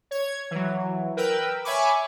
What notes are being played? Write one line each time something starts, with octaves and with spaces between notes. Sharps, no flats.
C#5 G#6
E3 F#3
A#4 B4 G5 E6
C#5 E5 G#5 B5 C#6 D6